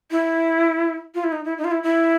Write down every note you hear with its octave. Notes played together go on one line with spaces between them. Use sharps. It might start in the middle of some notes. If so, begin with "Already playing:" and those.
E4
F4
E4
D#4
E4
D#4
F4
E4
E4